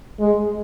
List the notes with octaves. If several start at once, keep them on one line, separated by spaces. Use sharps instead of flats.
G#3